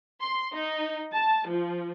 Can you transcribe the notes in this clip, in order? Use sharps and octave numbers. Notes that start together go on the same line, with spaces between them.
C6
D#4
A5
F3